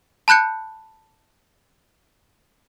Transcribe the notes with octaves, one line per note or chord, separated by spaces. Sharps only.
A5 B5 F#6 G6 C#7